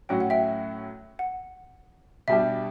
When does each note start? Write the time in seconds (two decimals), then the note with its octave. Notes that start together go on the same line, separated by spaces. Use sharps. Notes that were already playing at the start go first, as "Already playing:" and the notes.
0.09 A2 F#3 C#4 F#4 G5
0.20 F#5
0.30 E5 G5
1.19 F#5
2.28 B2 G3 D4 G4 E5